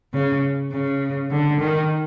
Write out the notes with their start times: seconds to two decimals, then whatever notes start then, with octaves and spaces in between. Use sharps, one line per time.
0.14 C#3
0.72 C#3
1.30 D3
1.59 D#3